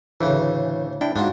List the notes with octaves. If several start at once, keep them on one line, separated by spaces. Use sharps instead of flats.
D2 A2 C#3 E3
D4 E4 G5
G#2 D4 F4 F#4